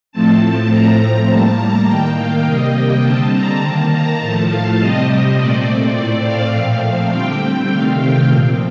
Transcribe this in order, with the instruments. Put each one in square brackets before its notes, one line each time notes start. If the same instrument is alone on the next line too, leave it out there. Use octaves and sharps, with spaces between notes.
[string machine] A2 F3 A3 C4 A5
A2 F3 A3 C4 A#5
A2 G3 A#3 A5
A#5
D#3 A#3 G5
F5
C3 G3 A#3 D#5
G5
D3 G3 C4 A5
A#5
D#3 A#3 A5
A#5
A2 F3 A3 A5
F5
C3 G3 C4 D#5
A#2 A3 C4 D5
A2 A3 C4 D5
F5
A#2 F3 A3 C4 F5
D3 G3 C4 G5
C3 D#3 A3 C4 F5
G5
A#2 F3 C4